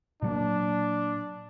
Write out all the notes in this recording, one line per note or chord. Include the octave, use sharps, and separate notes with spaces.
A#2 F#3 A#3 D4